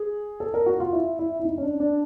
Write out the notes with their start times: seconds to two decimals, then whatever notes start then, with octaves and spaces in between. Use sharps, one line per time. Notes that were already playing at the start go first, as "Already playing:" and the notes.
Already playing: G#4
0.40 A4
0.54 A#4
0.66 F#4
0.80 F4
0.93 E4
1.19 E4
1.39 E4
1.45 D#4
1.58 C#4
1.63 D4
1.80 D4